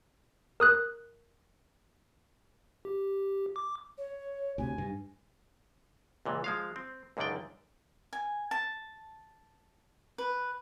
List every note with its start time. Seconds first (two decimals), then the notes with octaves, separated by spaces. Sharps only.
0.60 A#4 D#6 F#6
2.85 G4
3.56 D6
3.97 C#5
4.58 D2 C3 G#5
4.78 G2
6.26 C#2 A#2 E3
6.44 F3 G#3 F5
6.76 C4
7.17 C#2 F#2 D3 D#3 D5 G5
8.13 G#5
8.51 A5
10.18 B4